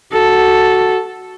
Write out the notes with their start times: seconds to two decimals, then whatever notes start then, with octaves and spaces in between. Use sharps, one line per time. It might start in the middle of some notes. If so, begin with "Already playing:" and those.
0.13 F#4 A4